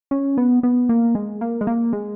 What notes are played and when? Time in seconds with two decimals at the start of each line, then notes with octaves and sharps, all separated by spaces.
0.11 C#4
0.37 B3
0.63 B3
0.89 A#3
1.15 G#3
1.41 A#3
1.61 G#3
1.67 A#3
1.93 G#3